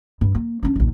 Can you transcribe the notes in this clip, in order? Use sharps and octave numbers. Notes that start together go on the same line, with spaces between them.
G2
A#3
C#4 D4
A#1 D#2